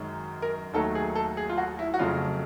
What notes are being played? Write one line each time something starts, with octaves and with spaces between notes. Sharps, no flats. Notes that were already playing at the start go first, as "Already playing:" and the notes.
Already playing: F#2 D#3 G#3
A#4
D#2 D#3 F#3 A3 A4
G#4
A4
G#4
F4
F#4
E4
F#4
F2 C#3 F#3 A3 F4